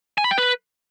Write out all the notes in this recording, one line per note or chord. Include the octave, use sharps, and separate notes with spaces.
G#5
B5
G5
B4